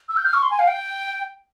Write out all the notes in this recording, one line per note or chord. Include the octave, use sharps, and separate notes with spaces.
E6
G6
F6
C#6
C6
G#5
F5
G5